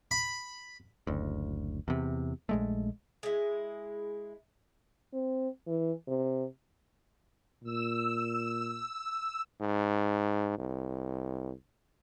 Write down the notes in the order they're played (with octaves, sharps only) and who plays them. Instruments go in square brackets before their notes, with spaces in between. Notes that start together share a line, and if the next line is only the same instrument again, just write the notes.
[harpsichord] B5
[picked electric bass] F#1 D2
E2 C3
A#1 G#3 A3
[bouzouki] G#3 E4
[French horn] C4
E3
C3
[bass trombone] A#2 [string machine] E6
[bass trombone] G#2
C2